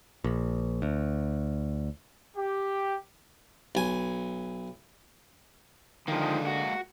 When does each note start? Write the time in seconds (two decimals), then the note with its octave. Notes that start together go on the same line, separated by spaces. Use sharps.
0.24 A#1
0.82 D2
2.36 G4
3.75 B1 G#5
6.08 D3 D#3 F3 G#3 A#3
6.47 F#4